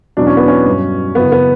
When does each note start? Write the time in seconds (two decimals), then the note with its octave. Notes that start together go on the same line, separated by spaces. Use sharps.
0.17 E2 B2 F#3 D4
0.27 C#4
0.37 B3
0.48 C#4
0.66 G2 F#3
1.15 F#2 C#3 E3 B3
1.32 B3